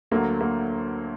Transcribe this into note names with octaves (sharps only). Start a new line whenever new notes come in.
D2 D3 F#3 A#3
A#3